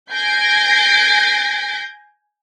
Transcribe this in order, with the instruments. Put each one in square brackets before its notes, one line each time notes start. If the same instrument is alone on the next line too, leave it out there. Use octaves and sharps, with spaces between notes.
[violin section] G#5 G6 G#6 A#6 C7 D7